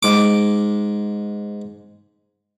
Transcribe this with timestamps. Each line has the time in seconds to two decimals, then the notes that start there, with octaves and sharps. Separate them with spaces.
0.03 G#2 D6